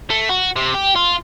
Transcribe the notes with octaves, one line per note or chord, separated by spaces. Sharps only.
A3
F#4
C3
G4
F4